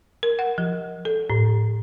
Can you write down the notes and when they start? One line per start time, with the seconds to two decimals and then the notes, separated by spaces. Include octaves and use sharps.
0.23 A#4
0.39 F#5
0.58 F3
1.05 A4
1.30 A2